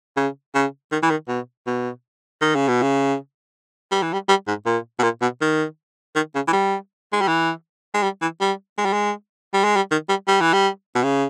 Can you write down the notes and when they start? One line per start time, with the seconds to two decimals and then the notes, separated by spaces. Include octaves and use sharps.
0.17 C#3
0.55 C#3
0.92 D#3
1.03 E3
1.10 D#3
1.28 B2
1.67 B2
2.41 D#3
2.55 C#3
2.68 B2
2.82 C#3
3.92 G3
4.03 E3
4.13 G3
4.29 G3
4.48 G#2
4.66 A#2
4.99 B2
5.03 A#2
5.22 B2
5.41 D#3
6.15 D#3
6.35 C#3
6.48 E3
6.53 G3
7.13 G#3
7.21 G3
7.28 E3
7.95 G#3
8.03 G3
8.22 E3
8.41 G3
8.78 G#3
8.85 G3
8.93 G#3
9.53 G3
9.64 G#3
9.76 G3
9.91 D#3
10.09 G3
10.28 G3
10.41 E3
10.53 G3
10.95 B2
11.03 C#3